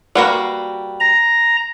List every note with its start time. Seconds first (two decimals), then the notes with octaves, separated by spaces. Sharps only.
0.15 G3 A#3 F#4 A#4 B4 F#5
1.00 A#5